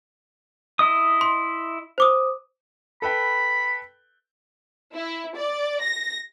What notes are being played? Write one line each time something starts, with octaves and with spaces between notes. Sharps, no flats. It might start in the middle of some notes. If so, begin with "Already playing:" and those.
E4 D#5 D#6
C6
C5 D6 D#6
A4 B4 G5 B5
E4
D5
A#6